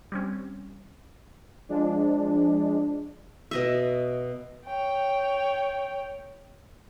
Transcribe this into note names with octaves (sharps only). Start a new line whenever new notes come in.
G3 C4 C#4
F3 G#3 D4
B2 D#5 E5
C#5 G5